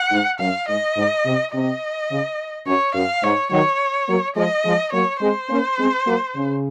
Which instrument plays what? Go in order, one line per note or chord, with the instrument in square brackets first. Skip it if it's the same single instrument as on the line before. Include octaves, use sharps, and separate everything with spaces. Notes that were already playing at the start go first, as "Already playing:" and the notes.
Already playing: [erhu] F#5
[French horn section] G#2
[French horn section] F#2 [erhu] F5
[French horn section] G#2 [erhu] D#5
[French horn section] G#2
C3
[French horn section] C3 [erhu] D#5
[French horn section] C#3
[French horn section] F#2 [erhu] C#5
[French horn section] F#2 [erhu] F5
[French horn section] G#2 [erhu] C#5
[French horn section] D#3 F#3 [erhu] C#5
[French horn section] F#3 A#3
[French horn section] F3 G#3 [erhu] D#5
[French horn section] F3 G#3
[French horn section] F#3 A#3 [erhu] C#5
[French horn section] G#3 C4 [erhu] C5
[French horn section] A#3 C#4
G#3 C4
F#3 A#3
C#3